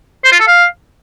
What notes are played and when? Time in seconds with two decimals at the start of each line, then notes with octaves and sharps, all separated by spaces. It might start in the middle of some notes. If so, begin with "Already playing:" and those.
0.24 C5
0.32 F4
0.40 A4
0.48 F5